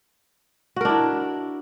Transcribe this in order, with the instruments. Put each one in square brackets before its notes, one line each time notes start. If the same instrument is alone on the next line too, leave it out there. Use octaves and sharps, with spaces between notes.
[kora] F#4
A#4
D4
E4